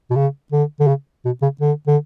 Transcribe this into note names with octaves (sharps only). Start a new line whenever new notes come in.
B2
C#3
D3
D3
C#3
B2
C#3
D3
D3